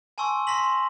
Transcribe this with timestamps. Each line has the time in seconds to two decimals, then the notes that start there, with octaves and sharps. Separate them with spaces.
0.18 G#5 A5 C6 C#6 E6
0.47 A#5 C6 A#6 B6 F#7